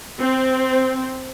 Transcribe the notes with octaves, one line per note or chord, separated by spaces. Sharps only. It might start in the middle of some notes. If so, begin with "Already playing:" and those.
C4